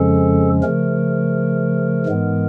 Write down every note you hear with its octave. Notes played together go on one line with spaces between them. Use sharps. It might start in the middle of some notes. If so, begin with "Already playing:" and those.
Already playing: F2 C#3 F3 G#3 C#4 A4
C#3 F3 A3 A#4
G#2 E3 G#3 B3